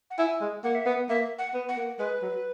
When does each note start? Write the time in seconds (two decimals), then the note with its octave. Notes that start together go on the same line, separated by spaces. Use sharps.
0.10 F#5
0.18 E4 G#5
0.41 G#3
0.64 A#3 F#5
0.75 E5
0.86 B3 F#5
1.09 A#3 E5
1.39 F#5
1.54 B3
1.69 F#5
1.76 A#3
1.99 G#3 B4
2.22 F#3